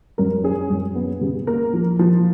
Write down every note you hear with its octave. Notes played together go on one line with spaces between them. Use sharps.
F#2 A#4
C#4 G#4
F#2
B3
C#3
A#3 A#4
F3
F3